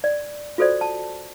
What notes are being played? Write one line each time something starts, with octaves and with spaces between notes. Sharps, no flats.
D5
F4 F#4 A4 C5 D5
A5